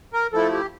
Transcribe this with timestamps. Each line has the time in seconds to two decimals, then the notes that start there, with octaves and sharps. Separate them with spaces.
0.13 A#4
0.32 F3 A3 E4 A4
0.52 G4